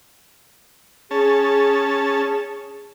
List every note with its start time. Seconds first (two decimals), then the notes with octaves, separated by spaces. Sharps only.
1.11 C#4 G#4 A5